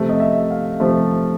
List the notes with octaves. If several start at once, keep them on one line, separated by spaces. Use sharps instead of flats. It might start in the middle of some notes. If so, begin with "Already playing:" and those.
Already playing: C3 F3 A3
D#5
E5
F5
C3 F3 A3